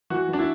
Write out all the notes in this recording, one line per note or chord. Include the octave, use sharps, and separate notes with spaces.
E3 F#4
E3 D4
E4